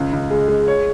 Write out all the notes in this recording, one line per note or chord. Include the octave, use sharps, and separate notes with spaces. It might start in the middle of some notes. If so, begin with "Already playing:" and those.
Already playing: C#2
C#2
G#3
G#3
C#5